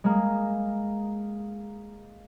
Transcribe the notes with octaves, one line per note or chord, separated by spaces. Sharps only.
G#3 A#3